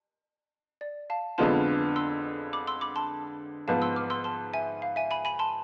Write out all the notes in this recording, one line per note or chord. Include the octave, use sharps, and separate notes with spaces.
D5
F5 A5
F2 D3 G#3 B3 F4 A5 C6
C6 E6
B5 D6
C6 E6
B5 D6
A5 C6
G#2 F3 B3 F5 A5
C6 E6
D6 F6
C6 E6
A5 C6
E5 G#5
F5
E5 G#5
G#5 B5
G#5 B5
A5 C6